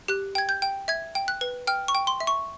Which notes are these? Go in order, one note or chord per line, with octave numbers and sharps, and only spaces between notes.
G4 F#6
G5 G#6
G6
G5
E5 G#6
G5
F#6
B4
G5 F6
C#6
G5
C6
E5
C#6